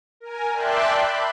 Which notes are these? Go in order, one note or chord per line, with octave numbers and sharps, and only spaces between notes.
A#4 G#5
D5 E5 G5 A5 C6 F#6
B5